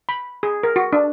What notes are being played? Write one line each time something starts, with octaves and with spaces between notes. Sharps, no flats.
B5
G#4
A#4
F#4
D4